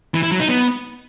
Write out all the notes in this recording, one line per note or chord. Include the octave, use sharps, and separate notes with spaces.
E3
E4
F#3
D#4
B3